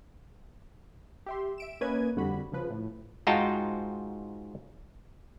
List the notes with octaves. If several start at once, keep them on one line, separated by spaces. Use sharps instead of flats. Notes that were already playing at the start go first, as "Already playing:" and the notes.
G4 E5 C6
E5 D7 E7
A#3 C#4 B4 D#5 G#6 D#7
F2 D3 G3 F#4 B5
C#3 F3 B4
A2
G#2 D#4 F4 F#4 G5 A5